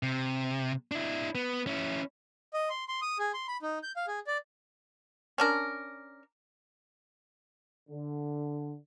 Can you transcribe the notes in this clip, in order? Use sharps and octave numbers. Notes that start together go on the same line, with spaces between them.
C3
D4 E4
B3
C#4 E4
D#5
C6
C6
D#6
G#4
C6
B5
D#4
G6
F5
G#4
D5
C#4 D4 A#4
D3